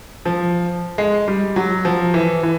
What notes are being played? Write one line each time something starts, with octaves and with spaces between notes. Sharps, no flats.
F3
G#3
G3
F#3
F3
E3
E3